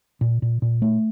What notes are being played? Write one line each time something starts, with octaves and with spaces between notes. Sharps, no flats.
A#2
A#2
A#2
A3